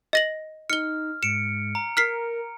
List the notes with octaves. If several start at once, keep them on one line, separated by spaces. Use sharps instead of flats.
D#5 A#6 F#7
D#4 F6 C#7 G7
G#2 C#7 D7 E7
A#5
A#4 F6 B6 C7